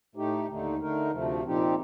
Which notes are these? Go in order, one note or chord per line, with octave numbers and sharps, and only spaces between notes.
A2 A3 D#4 G4
D#2 D3 A3 D#4
D3 A3 D#4 A#4
D2 C3 F3 A3
A#2 F3 C4 D#4 G4